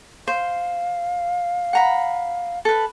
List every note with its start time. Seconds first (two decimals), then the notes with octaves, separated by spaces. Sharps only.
0.28 C5 F5
1.73 F#5 A#5 B5
2.65 A4 B4